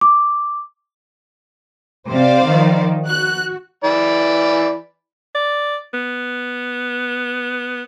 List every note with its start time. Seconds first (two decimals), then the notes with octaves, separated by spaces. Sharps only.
0.01 D6
2.09 C3 C5 D5 F5
2.46 D#3 F3
3.07 F#4 F#6
3.84 E3 D5 B5
5.35 D5
5.94 B3